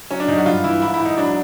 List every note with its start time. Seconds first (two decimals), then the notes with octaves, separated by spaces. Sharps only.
0.11 F#3 C#4
0.20 D4
0.28 F#2 D#4
0.38 F#4
0.46 G2 F4
0.64 E3 E4
0.82 G#2 E4
0.94 E4
0.99 G#2
1.05 D#4
1.17 F#3 D4